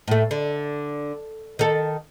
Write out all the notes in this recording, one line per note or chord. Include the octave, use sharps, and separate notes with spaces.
A2 A3
D3
D#3 A4